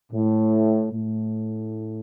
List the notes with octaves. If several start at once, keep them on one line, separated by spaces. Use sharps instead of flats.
A2
A2